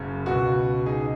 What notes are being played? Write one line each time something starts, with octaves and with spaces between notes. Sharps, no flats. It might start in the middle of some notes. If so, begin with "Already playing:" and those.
Already playing: F#1 F#2 C#3
C#2 B2 F#4
D#4 G#4